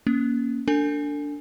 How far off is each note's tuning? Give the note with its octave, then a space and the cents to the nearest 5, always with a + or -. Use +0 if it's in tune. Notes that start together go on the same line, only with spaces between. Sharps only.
A#3 +15 C#4 +0
D4 -10 A4 +40 G#5 +0